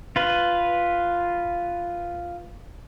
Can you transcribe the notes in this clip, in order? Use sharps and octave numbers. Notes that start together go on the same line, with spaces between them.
F4 B4